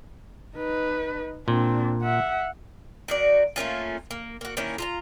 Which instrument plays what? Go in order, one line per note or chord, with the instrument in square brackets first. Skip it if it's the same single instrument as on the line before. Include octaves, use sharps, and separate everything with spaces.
[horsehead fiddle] D#4 B4
[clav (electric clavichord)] A#2 [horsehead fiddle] C4 D4
[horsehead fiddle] E5 F#5
[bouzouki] D#3 F#4 D5
A3 A#3 C#4 F4
A#3
A#3 F#4
D#3 A#3 C#4 E4
F4 A5 A#5